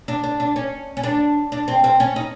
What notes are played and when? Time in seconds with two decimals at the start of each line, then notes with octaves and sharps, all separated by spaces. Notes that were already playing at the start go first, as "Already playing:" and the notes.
0.08 D4
0.24 D4
0.40 D4
0.56 C#4
0.97 C#4
1.03 D4
1.52 D4
1.68 C4
1.84 C4
2.00 C#4
2.16 D#4